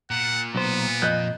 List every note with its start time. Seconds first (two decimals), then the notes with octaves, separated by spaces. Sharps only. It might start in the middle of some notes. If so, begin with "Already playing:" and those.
0.11 A#2 F#5
0.55 B1 B3 C5
1.02 F2 D#5 F#6 G6